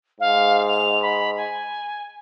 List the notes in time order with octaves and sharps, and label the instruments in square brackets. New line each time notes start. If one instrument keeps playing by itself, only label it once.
[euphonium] G#2 [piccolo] F5
[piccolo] F7
B5
G#5